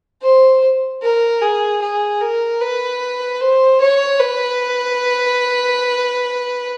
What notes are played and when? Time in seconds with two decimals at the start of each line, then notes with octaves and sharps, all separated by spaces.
0.23 C5
1.02 A#4
1.42 G#4
1.82 G#4
2.21 A#4
2.61 B4
3.41 C5
3.81 C#5
4.20 B4